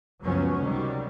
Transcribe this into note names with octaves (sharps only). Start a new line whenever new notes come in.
C#2 F#2 F3 F#3 B3 C#4
C3 D#3 F#3 G3